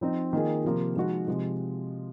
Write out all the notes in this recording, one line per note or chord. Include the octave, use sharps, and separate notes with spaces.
F3 C4 D#4
D#3 A#3 F4 G#4
C3 F3 A#3
F3 G#3 D#4 F#4
C3 F3 G#3